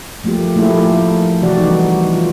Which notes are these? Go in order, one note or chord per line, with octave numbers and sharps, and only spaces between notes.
F3 A3 A#3 F4 G4
F3 A3 A#3 E4 G4 G#4
A3
C3 E3 F#4 G4 D5 F#5
G3 D#4
F4